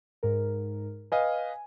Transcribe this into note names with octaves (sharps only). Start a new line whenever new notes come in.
G#2 A#4
B4 D#5 F5 G#5